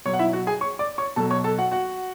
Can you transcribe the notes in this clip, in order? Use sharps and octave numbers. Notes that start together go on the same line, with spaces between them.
B2 F#3 C#5 C#6
F#5
E4 E5
F#4 F#5
G#4 G#5
C#5 C#6
D5 D6
C#5 C#6
B2 F#3 A4 A5
C#5 C#6
A4 A5
F#4 F#5
F#4 F#5